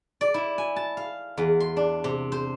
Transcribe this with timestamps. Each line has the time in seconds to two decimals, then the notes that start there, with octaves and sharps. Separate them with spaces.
0.21 D5
0.34 E4
0.58 G#5
0.76 A5
0.97 F5
1.38 E2
1.60 C6
1.77 D4
2.04 C3
2.32 C5